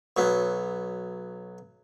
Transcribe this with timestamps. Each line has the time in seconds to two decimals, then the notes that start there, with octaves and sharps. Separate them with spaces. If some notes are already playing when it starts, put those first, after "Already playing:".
0.17 B1 F#3 B3